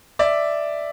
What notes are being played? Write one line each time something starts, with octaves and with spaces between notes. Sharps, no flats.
D5 E5